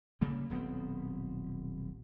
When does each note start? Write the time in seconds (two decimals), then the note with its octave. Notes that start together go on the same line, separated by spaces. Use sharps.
0.21 C#3 G3 A#3
0.50 D#1 B1 B3 C4